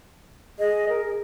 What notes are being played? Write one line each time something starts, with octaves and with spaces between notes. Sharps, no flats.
G#4 D#5
A#4